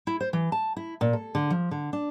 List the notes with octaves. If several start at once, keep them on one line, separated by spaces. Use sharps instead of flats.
E4
C5
E3
A5
E4
A#2
A4
D3
F3
D3
D4